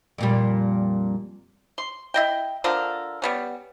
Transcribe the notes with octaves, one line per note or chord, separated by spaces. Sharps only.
F2 A#2 G3
C6
E4 D#5 G5
D3 F3 A4 A#4
G3 B3 C#4